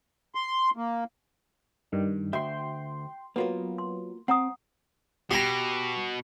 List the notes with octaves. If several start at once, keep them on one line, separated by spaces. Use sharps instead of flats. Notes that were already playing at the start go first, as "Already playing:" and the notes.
C6
A#3
G2 D#3 G3
D2 F#4 E5 G5 C6
F#3 A#3 B3 F4 A#4
C6
C4 F#5 A#5 D#6
B2 G4 G#5 A#5